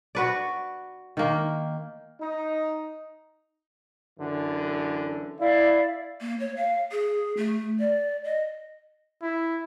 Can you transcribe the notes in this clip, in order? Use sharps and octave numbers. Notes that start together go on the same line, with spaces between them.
F#4 B4 D5
D#3 A#3
D#4
F#2 D3 E3
E4 D5 E5 F5
A#3
C#5
F5
G#4
A3
D5
D#5
E4